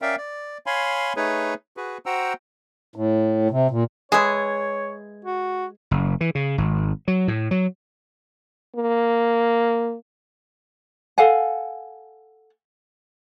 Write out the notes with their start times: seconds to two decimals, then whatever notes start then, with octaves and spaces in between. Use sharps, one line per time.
0.02 C#4 A#4 D5 E5 F5 G5
0.18 D5
0.66 C#5 F5 G#5 B5 C6
1.16 A3 D#4 G#4 B4 C#5
1.77 F#4 G#4 B4
2.06 F#4 C5 F#5 G5 A#5 E6
2.96 A2
3.51 C3
3.71 A#2
4.12 G#3 G#4 B4 C#5 E5
5.25 F#4
5.91 F#1
6.21 E3
6.35 C#3
6.58 G#1
7.08 F#3
7.28 A2
7.51 F#3
8.76 A#3
11.18 A4 F5 F#5 G#5